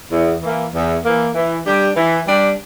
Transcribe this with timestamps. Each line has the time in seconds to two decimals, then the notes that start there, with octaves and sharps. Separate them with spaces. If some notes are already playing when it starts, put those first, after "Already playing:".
0.11 E2
0.42 E3 A#3
0.74 E2
1.04 E3 A#3
1.35 E3
1.65 G3 D4 G4
1.96 E3
2.26 G3 D4 G4